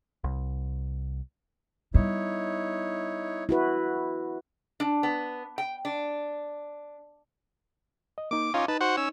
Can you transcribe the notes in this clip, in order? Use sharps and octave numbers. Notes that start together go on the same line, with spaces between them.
C2
G3 B3 D#4 E4 C#5
E4 F#4 B4
D4
B3
G5
D4
D#5
A#3 D#4 D6
C#4 D#4 F4 F5 D6
D#4 B4 A5
F#4 C5 F#5
C#4 E6